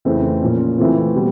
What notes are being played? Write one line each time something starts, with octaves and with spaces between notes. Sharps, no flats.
F2 C#3 E3 A3 C4
A#2 F3 A#3 C#4
E3 A3 C4 F4
B2 G3